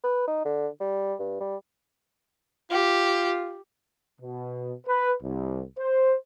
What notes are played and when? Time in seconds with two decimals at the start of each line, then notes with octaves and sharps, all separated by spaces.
0.04 B4
0.28 D#4
0.45 D3
0.81 G3
1.19 G2
1.40 G3
2.71 F4 G4
4.21 B2
4.87 B4
5.22 C2
5.78 C5